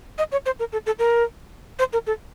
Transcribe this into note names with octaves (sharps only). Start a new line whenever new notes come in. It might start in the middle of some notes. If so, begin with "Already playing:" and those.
D#5
C#5
C5
A#4
A4
A4
A#4
C5
A#4
A4